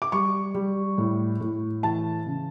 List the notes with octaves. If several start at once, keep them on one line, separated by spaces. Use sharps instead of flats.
D6
G3 C#6
G3
A2
A2
E3 A5
C#3